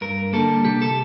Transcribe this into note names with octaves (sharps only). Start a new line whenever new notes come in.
G2 A#4
D3 G3 A#3 A4
C3 G4
A4